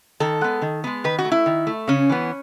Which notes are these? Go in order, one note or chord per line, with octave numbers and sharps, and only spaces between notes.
D#3 A4
G#3 B3
D#3
G#3 B3
D#3 B4
F#4
A3
E4
D#3
A3
C#3 C#4
E3 B3